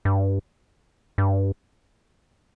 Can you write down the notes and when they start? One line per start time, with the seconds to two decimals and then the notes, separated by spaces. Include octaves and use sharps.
0.05 G2
1.18 G2